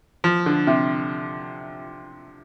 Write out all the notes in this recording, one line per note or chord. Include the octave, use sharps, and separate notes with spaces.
F3
D3
C3